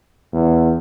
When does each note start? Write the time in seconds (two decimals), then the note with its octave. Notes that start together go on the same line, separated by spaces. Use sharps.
0.33 E2